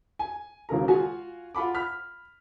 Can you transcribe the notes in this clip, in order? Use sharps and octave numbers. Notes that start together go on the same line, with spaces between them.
G#5
E1 D#2 C#3 A#4 A#5
F4 F#4 F5 G#5
F4 F#5 B5 D6
B5 F6 B6